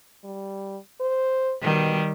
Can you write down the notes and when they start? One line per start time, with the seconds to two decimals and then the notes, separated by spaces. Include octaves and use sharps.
0.24 G3
1.00 C5
1.62 B2 D#3 G3